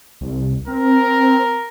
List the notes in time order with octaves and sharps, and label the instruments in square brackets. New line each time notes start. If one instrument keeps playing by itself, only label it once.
[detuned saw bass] C2
[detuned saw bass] C4 [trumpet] A#4